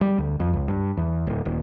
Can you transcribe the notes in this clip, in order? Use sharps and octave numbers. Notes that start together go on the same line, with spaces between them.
G3
D2
F2
C#2
G2
E2
D1
D#1